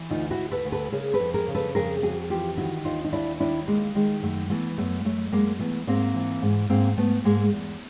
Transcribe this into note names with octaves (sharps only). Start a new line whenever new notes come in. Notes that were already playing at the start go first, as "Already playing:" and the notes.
Already playing: E3
D2 D#4 F4
E4 F#4
D2
A4 B4
D2
A4 B4
C#3 G#4 A#4
A4 B4
F2
G#4 A#4
C#3
A4 B4
F2 G#4 A#4
F2 F#4 G#4
E3 F4 G4
D#3 E4 F#4
D#2 D#4 F4
D#4
D#2 D4 E4
D#3 D4 E4
D#2 G#3 A#3
D#3 G#3
F#2 A3
E3 A3 B3
F#2 A3 B3
F#2 A3
F#2 G#3 A#3
E3 A3 B3
G#2 A#3 C4
E3
G#2
G#2 A#3 C4
G#2 A3 B3
G#2 G#3 A#3
E2